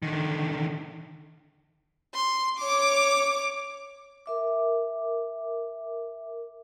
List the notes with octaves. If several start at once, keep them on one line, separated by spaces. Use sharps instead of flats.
D3 D#3
C6
C#5 D6
A#4 E5 D6